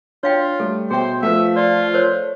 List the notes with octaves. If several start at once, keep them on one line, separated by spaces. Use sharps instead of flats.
D4 F4 C#5 F5 G5
G3 A3 A4
B2 G#4 C5 E5 G5
F3 A3 B4 E5 F#5
F4 D5
A#4 C5 C#5